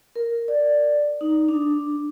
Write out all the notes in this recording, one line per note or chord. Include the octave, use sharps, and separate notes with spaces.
A#4
D5
D#4
D4